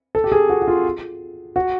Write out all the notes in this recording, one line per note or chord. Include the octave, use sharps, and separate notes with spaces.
A4
G4
G#4
F#4
F#4
F4
F#4